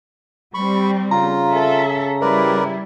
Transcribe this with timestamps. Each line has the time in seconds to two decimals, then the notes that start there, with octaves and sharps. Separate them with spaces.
0.54 G3 C4 B5 C#6
1.11 C#3 F4 A#5
1.52 A4 E5
2.21 G3 E4 A#4 B4 D5